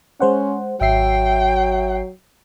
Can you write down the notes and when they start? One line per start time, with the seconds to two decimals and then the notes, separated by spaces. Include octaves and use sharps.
0.20 G#3 C#4 C5 F#5
0.81 G#1 F#3 E5 G5 C7